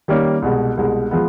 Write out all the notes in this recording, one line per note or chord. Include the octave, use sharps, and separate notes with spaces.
D#3 G3 A#3 C#4
C2 B2 G#3
C2 B2 G#3
F3 G#3 B3